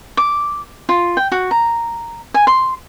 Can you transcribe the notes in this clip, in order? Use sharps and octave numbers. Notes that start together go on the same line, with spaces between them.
D6
F4
G5
F#4
A#5
G#5
C6